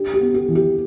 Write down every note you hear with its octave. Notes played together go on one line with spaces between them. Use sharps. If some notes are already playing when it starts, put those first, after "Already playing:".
Already playing: D4 G4
G4
B3
G4
E3
G4